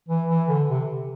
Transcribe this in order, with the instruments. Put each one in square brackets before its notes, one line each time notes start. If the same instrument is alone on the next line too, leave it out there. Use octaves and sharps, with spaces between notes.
[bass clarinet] E3
E3
D3
C3